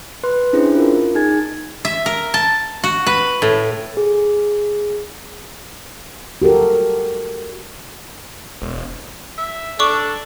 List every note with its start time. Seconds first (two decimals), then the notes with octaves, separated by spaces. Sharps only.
0.23 B4 C6 F#6
0.53 C#4 D4 E4 G#4 C5
0.75 F4 A#4
1.15 D#4 G#4 G#5 G#6 A6
1.85 E5
2.06 A#4
2.34 A5
2.84 F#4
3.07 B4
3.42 A2
3.97 G#4
6.42 F#4 G4 A4 A#4
8.62 E1
9.38 E5
9.79 D4 A4 D5 C#6 D6